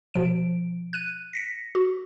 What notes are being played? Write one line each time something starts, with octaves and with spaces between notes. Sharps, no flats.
B2 F3 D7
F#6 D#7
A#6 B6 C#7
F#4